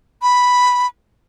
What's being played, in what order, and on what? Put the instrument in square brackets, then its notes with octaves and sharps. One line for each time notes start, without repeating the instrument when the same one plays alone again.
[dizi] B5